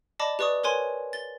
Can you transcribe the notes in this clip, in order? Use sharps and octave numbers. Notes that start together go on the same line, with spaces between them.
D5 D#5 A5 B5 D6
G4 B4 D5 C#6 D#6
A#4 B4 C#5 G#5 C6
A6 G7